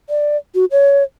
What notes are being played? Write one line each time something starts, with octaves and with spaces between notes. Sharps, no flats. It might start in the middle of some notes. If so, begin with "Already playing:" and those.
D5
F#4
C#5